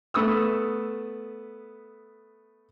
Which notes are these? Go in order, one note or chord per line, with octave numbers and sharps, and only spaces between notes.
A3 B3 D#6 E6